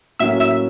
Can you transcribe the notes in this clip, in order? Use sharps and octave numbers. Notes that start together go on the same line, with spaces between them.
A2 F#3 A#3 C#4 F#4 E5 E6
E5 E6